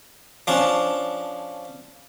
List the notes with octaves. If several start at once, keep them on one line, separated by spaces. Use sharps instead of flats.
F3 C#4 D4